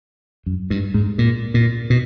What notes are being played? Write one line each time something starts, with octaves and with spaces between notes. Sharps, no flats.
F#2
G2
G#2
A#2
A#2
B2